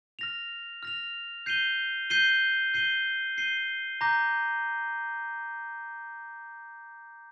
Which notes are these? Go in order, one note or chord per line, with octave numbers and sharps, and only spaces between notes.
F6 A#6 F7
F6 A#6 F7
G6 C7 D#7 G7
G6 C7 D#7 G7
G6 C7 D#7 G7
G6 C7 D#7 G7
A#5 D6 G6 A#6